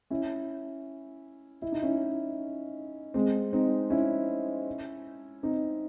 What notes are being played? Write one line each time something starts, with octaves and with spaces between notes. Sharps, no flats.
C#4 E4
E4
D#4
C#4 E4
G#3 C4
C4 D#4
C#4 E4
C4 D#4